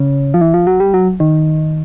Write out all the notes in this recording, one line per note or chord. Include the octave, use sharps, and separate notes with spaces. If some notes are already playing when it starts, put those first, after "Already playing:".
Already playing: C#3
F3
E3
F3
F#3
G3
F#3
D#3